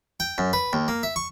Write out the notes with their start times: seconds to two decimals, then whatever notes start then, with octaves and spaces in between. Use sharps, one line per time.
0.20 G5
0.38 F#2
0.53 B4
0.73 D#2
0.88 A#3
1.03 E5
1.16 C#6